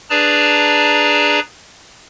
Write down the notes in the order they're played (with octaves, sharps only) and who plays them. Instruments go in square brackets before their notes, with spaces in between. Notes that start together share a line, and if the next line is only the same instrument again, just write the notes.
[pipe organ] D4 G#4 B4 D5 A5 A#5